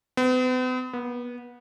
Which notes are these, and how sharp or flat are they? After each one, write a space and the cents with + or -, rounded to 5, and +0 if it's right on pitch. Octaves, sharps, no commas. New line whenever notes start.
B3 +45
B3 -25